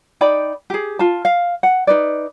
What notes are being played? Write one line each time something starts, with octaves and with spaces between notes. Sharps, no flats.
D#4 D5 G5 B5
G4 G#4
F4 A5
F5
F#5
D#4 B4 D5